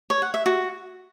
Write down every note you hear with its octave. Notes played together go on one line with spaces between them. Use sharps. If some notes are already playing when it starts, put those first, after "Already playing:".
C#5
F#5
E5
F#4